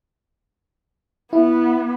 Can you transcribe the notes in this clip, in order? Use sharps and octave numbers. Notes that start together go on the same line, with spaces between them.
B3 E4